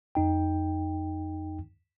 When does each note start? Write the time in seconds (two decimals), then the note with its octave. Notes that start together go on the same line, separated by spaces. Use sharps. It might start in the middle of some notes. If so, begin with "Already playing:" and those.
0.15 F2 D#4 G5